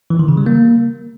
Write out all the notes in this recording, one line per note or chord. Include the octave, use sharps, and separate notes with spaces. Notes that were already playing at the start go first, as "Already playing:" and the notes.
E3
D#3
C#3
G3
A#3